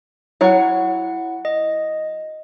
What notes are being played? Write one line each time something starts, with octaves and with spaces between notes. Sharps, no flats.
F#3 E4 C#5 F#5
D#5